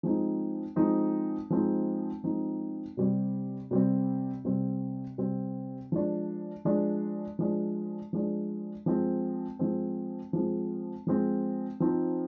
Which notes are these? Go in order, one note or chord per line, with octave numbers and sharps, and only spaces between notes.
F3 G#3 C4 D#4
F3 G#3 C4 D#4
F3 G#3 C4 D#4
F3 G#3 C4 D#4
C3 G3 C4
C3 G3 C4
C3 G3 C4
C3 G3 C4
F3 G#3 D4
F3 G#3 D4
F3 G#3 D4
F3 G#3 D4
F3 G#3 C4
F3 G#3 C4
F3 G#3 C4
F3 G#3 C4
F3 C4 D#4